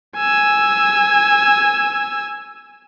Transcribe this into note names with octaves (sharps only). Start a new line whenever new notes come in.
G#5 E6